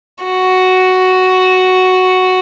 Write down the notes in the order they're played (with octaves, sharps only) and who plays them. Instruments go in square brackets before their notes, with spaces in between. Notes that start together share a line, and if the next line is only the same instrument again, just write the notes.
[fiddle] F#4